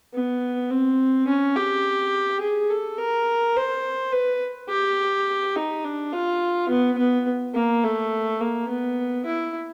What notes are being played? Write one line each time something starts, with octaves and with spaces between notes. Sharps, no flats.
B3
C4
C#4
G4
G#4
A4
A#4
C5
B4
G4
D#4
D4
F4
B3
B3
A#3
A3
A#3
B3
E4